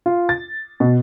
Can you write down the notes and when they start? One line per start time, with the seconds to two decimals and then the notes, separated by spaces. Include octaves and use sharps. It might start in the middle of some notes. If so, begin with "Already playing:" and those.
0.06 F4
0.29 A6
0.80 B2